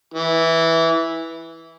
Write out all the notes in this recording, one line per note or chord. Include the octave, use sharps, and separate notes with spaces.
E3